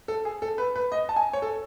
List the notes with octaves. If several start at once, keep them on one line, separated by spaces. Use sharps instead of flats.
A4
G#4
A4
B4
B4
D#5
A5
G#5
C#5
A4